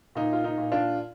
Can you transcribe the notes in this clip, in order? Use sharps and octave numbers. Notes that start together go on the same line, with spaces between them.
A#2 D#4
F4
D#4
A#2
D4 F4